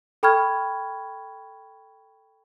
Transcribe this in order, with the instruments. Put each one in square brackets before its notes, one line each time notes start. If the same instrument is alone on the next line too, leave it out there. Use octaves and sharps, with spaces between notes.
[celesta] A4 G5 B5 C#6 F6 G#6